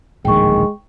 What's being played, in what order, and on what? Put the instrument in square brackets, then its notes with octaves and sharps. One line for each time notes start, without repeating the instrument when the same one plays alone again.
[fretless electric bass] D1 A#1 D#3 [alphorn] G#3 [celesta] G5 C#6